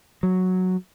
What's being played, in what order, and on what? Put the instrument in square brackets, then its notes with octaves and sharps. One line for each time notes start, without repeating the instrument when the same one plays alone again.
[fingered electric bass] F#3